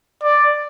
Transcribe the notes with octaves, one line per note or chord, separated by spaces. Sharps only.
D5